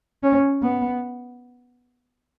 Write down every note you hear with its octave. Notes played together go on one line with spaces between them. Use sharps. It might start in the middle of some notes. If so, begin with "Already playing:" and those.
C#4
B3